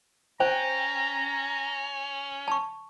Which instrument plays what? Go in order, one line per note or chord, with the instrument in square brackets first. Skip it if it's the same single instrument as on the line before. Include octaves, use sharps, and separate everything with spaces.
[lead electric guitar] C#4 [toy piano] C5 [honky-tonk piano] G5 [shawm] A#5
[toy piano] A5 C#6